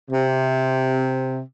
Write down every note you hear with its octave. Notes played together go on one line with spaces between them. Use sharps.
C3